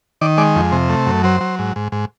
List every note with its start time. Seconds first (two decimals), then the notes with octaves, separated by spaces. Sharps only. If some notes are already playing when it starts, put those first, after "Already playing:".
0.21 D#3 D5
0.37 G#3 D5
0.56 F2
0.72 C3
0.89 A3
1.06 F#2
1.23 F#3 C5
1.41 F#3
1.59 G#2
1.76 G#2
1.92 G#2